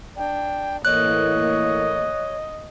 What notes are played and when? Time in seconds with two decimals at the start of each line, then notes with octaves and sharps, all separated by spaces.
0.17 D4 G5
0.85 A2 E3 A#3 C#5 D#5 F#6